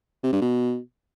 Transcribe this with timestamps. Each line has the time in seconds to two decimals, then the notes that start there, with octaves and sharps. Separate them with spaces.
0.23 C3
0.33 G2
0.42 B2